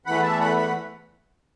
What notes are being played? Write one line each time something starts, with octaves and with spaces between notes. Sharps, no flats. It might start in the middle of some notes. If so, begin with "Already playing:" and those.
E2 E3 A3 F#5 B5
E5 A5
F#5 B5
F#5 B5